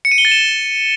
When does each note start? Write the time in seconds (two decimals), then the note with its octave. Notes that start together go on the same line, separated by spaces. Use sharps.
0.05 C#7
0.12 D#7
0.18 G7
0.25 A6
0.31 E7